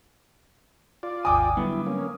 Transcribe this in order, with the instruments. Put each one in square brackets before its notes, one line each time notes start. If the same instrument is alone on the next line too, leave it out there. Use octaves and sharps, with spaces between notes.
[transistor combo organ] F4 D5
[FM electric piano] G#1 D#2 A#5 [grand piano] G5 D6 D#6 [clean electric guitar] G#5
[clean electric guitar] G2 [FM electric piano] D3 F#3 B3 [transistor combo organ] E4
[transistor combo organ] A#3 C#4